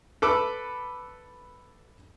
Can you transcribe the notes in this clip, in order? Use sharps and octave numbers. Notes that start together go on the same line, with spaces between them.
A4 B4 D6 E6